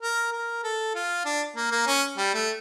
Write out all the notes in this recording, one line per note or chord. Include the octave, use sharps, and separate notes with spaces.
A#4
A#4
A4
F4
D4
A#3
A#3
C#4
G3
A3